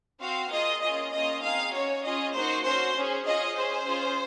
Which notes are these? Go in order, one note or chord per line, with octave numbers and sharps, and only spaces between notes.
C4 F#4 F5
A#3 F4 G#4 D#5
A#3 C#4 F4 G#4 D#5
A#3 C#4 F4 D#5
C4 D#4 G#4 F5
C#4 F#4 C#5
C#4 F4 G#4 D#5
A#3 D#4 F#4 C5
C#4 F#4 C5
C#4 G#4
C#4 F4 G#4 D#5
C#4 G#4 C5
C#4 F4 G#4